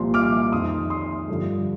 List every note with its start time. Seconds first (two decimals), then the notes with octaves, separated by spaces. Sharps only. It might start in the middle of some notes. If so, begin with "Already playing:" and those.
Already playing: C2 A#2 F3 C6
0.14 D6 F6
0.52 F2 D#3 C6 D#6
0.90 C6 D#6
1.28 G2 D3 F3